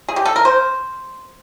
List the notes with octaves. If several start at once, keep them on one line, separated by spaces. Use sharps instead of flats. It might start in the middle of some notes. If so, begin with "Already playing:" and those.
G#4
G4
A4
A#4
C5